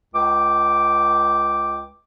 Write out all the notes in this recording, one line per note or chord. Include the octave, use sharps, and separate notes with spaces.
C#2 G5 D6